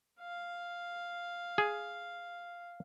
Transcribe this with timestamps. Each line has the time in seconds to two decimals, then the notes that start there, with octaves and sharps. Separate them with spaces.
0.20 F5
1.58 G#4